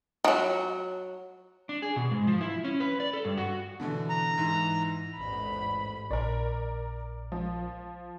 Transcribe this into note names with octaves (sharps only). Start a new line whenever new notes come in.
D#3 F#3
D4
G#4
B2
G#2
F3
E4
C#4
B4
D5
A4
G2
F#4
B2 D3 E3
A#5
G#2 E3
A1 E2 G#2 B5
A#1 A#4 D5
F3